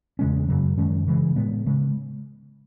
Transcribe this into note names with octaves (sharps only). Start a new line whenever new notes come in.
E2 C#3 G#3 C#4
F#2 C#3 F#3
F#2 D#3 G#3 C#4
C#3 E3 G#3
A2 G#3 B3
C#3 G#3